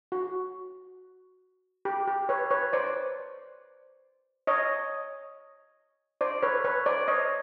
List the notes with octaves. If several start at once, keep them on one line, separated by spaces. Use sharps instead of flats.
F#4
G4
G4
B4 C#5
B4 C#5
C5 D5
C#5 D#5
C5 D5
B4 C#5
B4 C#5
C5 D5
C#5 D#5